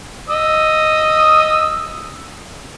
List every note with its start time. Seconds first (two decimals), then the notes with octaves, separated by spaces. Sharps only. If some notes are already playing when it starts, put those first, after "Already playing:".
0.29 D#5 D#6 E6